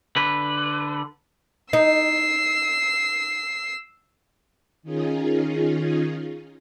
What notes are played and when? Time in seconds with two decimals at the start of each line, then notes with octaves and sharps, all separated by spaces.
0.16 D3 B4
1.73 D#4 E6 C7
4.83 D#3 C#4 D#4 F4 G#4